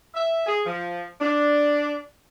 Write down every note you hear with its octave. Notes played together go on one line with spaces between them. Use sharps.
E5
G#4
F3
D4